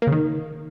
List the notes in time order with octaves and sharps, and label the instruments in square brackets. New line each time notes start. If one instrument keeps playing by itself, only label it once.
[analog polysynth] A#3
C#3
D#3